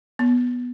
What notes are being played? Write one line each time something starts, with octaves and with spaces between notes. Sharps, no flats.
B3